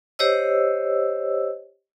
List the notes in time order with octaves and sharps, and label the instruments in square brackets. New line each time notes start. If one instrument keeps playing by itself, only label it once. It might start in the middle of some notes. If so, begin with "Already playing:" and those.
[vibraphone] G4 C5 C#5 D#5 E6